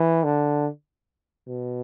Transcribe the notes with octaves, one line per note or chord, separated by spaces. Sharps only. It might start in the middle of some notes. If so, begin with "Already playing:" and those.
Already playing: E3
D3
B2